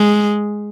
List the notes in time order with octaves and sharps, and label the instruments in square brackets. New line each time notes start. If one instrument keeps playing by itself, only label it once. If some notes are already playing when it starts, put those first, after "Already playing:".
Already playing: [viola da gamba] G#3